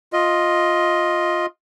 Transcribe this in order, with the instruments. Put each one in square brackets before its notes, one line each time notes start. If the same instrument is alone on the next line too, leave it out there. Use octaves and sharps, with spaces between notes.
[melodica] F4 D#5